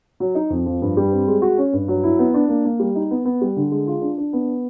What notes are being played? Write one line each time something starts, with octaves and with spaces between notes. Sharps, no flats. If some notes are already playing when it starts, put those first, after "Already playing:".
F#3
D#4
F2
F3
G2
G3
C4
G#3
F#4
C#4
G2
F#3
E4
B3
D4
A#3
A#3
G3
D#4
B3
B3
G3
D3
G#3
F4
D4
D4
B3